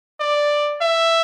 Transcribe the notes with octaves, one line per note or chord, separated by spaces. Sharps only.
D5
E5